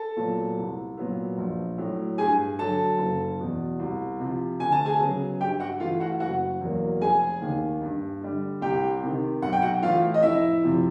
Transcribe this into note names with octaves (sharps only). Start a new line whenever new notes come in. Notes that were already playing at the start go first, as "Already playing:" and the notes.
Already playing: A4 A5
A#2 F#3 B3
C2
A#2 F#3 B3
A#1
A2 F#3
G2 G#4 G#5
D3 F#3 A4 A5
F#1
E2 B2
C2
C3 F3
D2 G#5
A5
G#4 G#5
C#3 F#3 B3
G2 G4 G5
F#4 F#5
E3 A3 F4 F5
F#4 F#5
F#1 F#4 F#5
E2 B2 F#3 A#3
F1 G#4 G#5
D#2 D#3
G2
D3 G3
C2 G4 G5
C3 D#3
B1 F#5
G5
F#4 F#5
A2 E3 A3 F4 F5
D#5
F1 E4 E5
F2 C3 F3